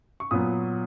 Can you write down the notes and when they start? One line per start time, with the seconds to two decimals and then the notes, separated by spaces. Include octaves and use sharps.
0.20 C#6
0.31 A#2 F#3 B3 D#6